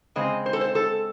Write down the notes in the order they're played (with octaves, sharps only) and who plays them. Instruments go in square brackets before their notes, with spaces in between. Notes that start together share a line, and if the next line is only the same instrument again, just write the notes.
[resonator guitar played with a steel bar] C#3 G#3 C4 D#5
C5
A4
C5
A4